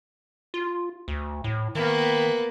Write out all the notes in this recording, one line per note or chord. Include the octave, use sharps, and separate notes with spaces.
F4
D2
A2
D#3 A#3 B3